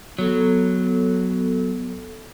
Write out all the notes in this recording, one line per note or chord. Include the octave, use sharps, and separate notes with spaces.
F#3 B3 A4